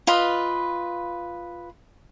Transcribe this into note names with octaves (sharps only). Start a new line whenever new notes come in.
F4 B4 D#5 B5